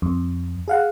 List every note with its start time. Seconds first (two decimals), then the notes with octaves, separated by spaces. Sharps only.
0.02 F2
0.68 G#4 F5 F#5